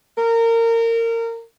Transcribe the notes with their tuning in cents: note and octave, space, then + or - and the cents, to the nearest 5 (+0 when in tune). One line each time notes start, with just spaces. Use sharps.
A#4 -25